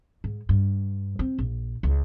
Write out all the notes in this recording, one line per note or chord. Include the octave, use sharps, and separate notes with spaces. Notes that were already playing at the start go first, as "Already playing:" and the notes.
G#2
G2
C4
A#1
C#2